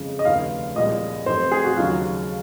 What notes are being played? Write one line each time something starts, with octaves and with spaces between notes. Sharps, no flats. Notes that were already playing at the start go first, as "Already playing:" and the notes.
Already playing: F2 C#3 G#3
D#5
F1 D#2 C#3 F5
C2 A#2 F3 G#3 D#5
F1 F2 C3 C5
G#4
F#4
D#2 C#3 F#3 F4